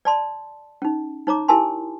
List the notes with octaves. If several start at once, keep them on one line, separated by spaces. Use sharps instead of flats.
D5 A5 C6
C#4 D#4
D#4 C#5 A#5 D6
E4 G4 A#4 G#5 A5 C6